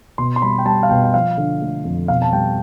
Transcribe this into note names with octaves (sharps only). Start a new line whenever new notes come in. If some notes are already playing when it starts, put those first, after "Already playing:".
B2 C6
C6
G3 B5
G5
G3 A5
F5
B2 G5
G5
F3 F5
D3
A3
F2
B2 F5
A5
G3 G5